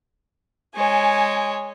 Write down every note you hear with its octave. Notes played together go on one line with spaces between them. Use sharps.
G#3 C#5 G#5